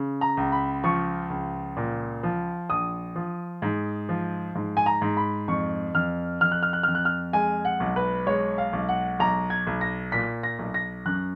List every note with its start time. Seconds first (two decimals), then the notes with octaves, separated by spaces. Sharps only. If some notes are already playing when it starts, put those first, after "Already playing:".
Already playing: C#3
0.21 A#5
0.37 C#2
0.52 B5
0.84 F3 C#6
1.30 C#2
1.77 A#2
2.23 F3
2.70 A#1 D#6
3.16 F3
3.62 G#2
4.09 F3
4.55 G#2
4.77 G#5
4.86 A#5
5.02 G#2
5.17 B5
5.48 F2 C#6
5.95 F2 F6
6.41 F2 F6
6.52 F#6
6.63 F6
6.73 F#6
6.83 F2 F6
6.95 F#6
7.05 F6
7.33 G#3 G#5
7.65 F#5
7.80 B1
7.96 B4
8.27 G#3 C#5
8.58 F5
8.73 B1
8.89 F#5
9.19 B1 A#5
9.50 G#6
9.67 B1
9.81 A#6
10.12 A#2 B6
10.43 A#6
10.59 B1
10.74 A#6
11.06 F#2 F#6